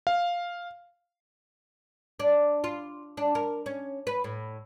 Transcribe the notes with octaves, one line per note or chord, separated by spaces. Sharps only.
F5
D4
F4
D4
A#4
C#4
B4
A2